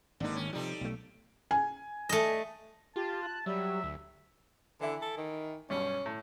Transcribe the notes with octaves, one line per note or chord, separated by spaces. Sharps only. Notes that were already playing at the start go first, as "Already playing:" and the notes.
G#1 D3 G3 A#3 D#4
D#2 C#4
C3 F3 G3 D#4 A4
B1 A3
G#5
A3 D#5
F4 G4 A5
F#6
F#3 G3 E5
D2
D3 E3 E4
A4
D#3
B1 G2 C#4
A2